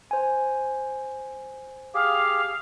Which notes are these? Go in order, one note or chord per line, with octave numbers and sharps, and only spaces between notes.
C5 G#5
G4 G#4 F5